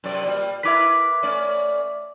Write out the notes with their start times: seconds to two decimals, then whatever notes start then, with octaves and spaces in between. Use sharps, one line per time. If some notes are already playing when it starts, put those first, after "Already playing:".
0.04 F#2 C3 D5
0.26 A#2 G3
0.63 E4 A#4 B4 E5 D6 B6
1.23 A3 C#4 D5